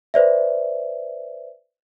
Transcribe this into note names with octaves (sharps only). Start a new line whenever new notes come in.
B4 C5 D5 E5